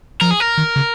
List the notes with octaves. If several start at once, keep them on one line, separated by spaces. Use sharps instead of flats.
F3 A#4
G#4
A#4
D#3
C#3